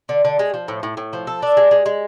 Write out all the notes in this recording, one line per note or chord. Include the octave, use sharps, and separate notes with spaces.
D3
D3
G#3
F3
A2
A2
A2
F3
A4
D4
G#3
G#3
G#3